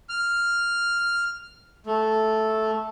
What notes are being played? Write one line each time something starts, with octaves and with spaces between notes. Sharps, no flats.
F6
A3